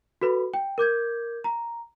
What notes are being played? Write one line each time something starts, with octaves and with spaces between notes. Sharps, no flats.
F#4 A4 B4 B5
G5
A#4 D6 G6 G#6
A#5